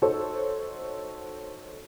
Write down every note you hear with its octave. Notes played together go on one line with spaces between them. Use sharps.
D#4 F#4 A4 C5 C#5